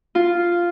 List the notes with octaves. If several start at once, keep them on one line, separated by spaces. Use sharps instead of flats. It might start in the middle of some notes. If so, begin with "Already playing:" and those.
F4